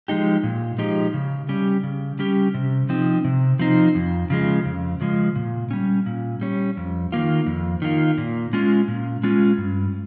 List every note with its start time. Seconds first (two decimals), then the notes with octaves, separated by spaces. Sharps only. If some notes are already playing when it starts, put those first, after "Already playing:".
0.08 F3 G#3 D#4 G4
0.43 A#2
0.78 F3 G#3 D#4 G4
1.14 C#3
1.49 G3 C#4 G4
1.83 C#3
2.19 G3 C#4 G4
2.54 C3
2.89 F3 C4 D#4
3.24 C3
3.59 F3 C4 D#4
3.95 F2
4.30 C#3 F3 G#3
4.65 F2
5.01 C#3 F3 G#3
5.35 A#2
5.71 G3 C#4
6.06 A#2
6.41 G3 C#4
6.77 F2
7.12 D#3 A#3 F4
7.46 F2
7.82 D#3 A#3 F4
8.18 A#2
8.53 G#3 C#4 F4
8.88 A#2
9.23 G#3 C#4 F4
9.58 G2